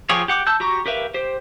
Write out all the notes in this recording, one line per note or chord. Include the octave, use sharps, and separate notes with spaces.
F3 F4 G4 G#4 C#5
G4 F#5 D6
A5 E6 G6
F#4 G4 A#5 C#6
G4 A#4 B4 E5 F5
G4 C5